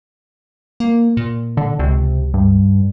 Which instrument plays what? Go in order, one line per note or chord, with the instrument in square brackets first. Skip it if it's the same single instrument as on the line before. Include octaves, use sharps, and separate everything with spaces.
[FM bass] A#3
A#2
[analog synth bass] D3
[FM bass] C#2 [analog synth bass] C3
[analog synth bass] G2